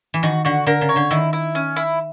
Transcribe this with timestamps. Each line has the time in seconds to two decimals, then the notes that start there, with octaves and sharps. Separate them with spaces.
0.14 E3
0.23 D#3 F#4
0.45 D3 F#4
0.67 D3 A#4
0.81 C#3
0.89 C#5
0.96 D3
1.11 D#3 E4
1.33 E4
1.55 C#4
1.76 E4